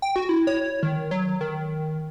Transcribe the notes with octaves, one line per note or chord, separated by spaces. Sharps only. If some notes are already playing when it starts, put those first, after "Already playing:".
G5
F#4
E4
C#5
D#3
F#3
D#3